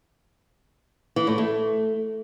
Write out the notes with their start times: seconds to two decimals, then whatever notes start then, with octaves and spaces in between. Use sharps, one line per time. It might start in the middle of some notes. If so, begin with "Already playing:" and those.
1.16 E3
1.27 A2
1.38 A3